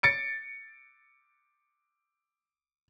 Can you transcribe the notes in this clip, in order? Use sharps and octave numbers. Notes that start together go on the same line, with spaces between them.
A6 C#7 D7